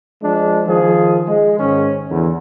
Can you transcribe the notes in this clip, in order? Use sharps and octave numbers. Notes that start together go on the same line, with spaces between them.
F3 G#3 D4
D#3 F3 G#4
G#3
G#2 D#3 C#4
E2 D3 E3